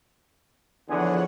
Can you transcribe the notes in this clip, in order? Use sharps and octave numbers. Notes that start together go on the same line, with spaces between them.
E2 D3 F3 G#4 C#5 F#5